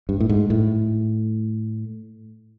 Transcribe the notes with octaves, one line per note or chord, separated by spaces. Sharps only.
G2
A2
G#2
A2